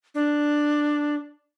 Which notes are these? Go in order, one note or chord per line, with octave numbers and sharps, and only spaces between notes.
D4